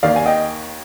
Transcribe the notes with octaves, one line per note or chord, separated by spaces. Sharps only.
D#2 D#3 D5 F5
G#5
D#5 G5